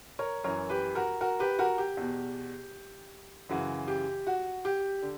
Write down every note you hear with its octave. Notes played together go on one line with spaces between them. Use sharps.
A#4 C#5
F#2 E3 A#4 C#5
G4 B4
F#4 A#4
F#4 A#4
G4 B4
F#4 A#4
G4
E2 B2
F#2 C#3 E3 F#4
G4
F#4
G4
D3